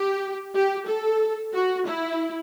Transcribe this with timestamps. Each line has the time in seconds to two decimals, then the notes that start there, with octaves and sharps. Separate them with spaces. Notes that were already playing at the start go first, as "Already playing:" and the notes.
Already playing: G4
0.54 G4
0.87 A4
1.53 F#4
1.86 E4